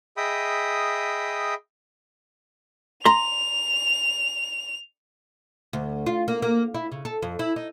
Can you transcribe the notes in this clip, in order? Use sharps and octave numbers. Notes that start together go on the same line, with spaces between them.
G#4 D#5 E5 G5 B5 D#6
A#5 C6 F7
D2
F4
A#3
A#3
E4
C#3
A4
F2
E4
D#4